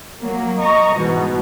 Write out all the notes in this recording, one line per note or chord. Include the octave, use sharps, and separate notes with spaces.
F#3 A#3
D#5 A#5 C#6
G#2 B2 E3